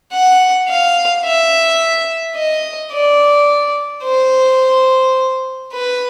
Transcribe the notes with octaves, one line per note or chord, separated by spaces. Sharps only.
F#5
F5
E5
D#5
D5
C5
B4